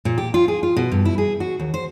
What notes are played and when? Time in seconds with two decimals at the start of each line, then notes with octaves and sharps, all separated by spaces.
0.05 A#2
0.18 G4
0.34 F4
0.48 G#4
0.63 F4
0.76 B2
0.91 G2
1.05 E4
1.18 G#4
1.40 F#4
1.59 D#2
1.74 C5